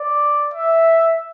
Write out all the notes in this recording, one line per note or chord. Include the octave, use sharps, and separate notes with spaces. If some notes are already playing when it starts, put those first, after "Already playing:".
Already playing: D5
E5